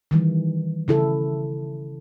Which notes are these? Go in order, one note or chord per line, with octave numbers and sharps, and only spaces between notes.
D#3 E3 G3
C#3 E4 A4